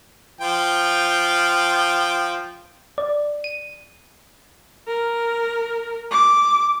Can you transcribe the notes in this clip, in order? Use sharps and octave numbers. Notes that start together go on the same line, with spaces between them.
F3 F4 G5
D5
D#7
A#4
D6